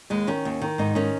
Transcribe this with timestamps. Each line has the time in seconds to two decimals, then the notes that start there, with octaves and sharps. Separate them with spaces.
0.10 D#2 G#3
0.27 D#3 C#4
0.45 D#2
0.62 D#3
0.78 G#2 D#4
0.95 D#3 C#4